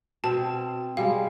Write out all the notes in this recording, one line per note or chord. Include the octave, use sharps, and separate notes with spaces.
B2 C4 A5
B2 G3 G#3 F5